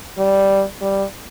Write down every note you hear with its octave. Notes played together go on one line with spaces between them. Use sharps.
G3
G3